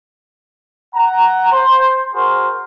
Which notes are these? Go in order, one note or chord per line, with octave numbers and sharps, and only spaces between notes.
F#5 A#5
C5
F#4 G#4 A#4 C5